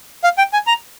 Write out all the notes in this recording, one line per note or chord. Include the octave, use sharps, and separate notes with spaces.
F5
G5
G#5
A#5